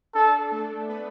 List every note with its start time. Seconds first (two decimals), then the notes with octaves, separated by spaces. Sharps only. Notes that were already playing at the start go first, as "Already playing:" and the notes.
0.15 D4 A4
0.52 A3 A4
0.88 B3 B4